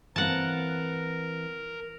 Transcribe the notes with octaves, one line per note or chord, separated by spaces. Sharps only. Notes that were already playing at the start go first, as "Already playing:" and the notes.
E3 A#3 C4 A#4 F#5 A5